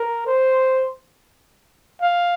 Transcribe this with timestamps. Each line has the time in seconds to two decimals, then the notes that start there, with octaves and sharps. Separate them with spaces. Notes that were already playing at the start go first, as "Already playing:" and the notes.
Already playing: A#4
0.26 C5
2.02 F5